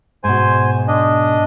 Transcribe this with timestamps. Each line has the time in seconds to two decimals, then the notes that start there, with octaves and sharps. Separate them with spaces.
0.24 G#2 B2 C5 G#5
0.88 D4 D#5